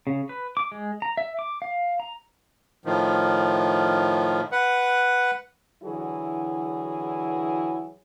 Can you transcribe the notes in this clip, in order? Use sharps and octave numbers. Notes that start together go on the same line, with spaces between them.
C#3
B4
D6
G#3
A#5
E5
D6
F5
A#5
A2 D#3 F3
B4 F#5
D3 E3 F#3 E4 F#4 G#4